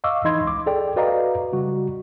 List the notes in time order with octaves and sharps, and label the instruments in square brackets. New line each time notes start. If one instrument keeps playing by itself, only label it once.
[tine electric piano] D#5 F5 C#6 D6 E6
E3 D#4 D#5 B5 C6 G#6
C#2 D6
G#4 A4 D5 G5
F#4 B4 D5 D#5 F5 A#5
C#3 G3 F#4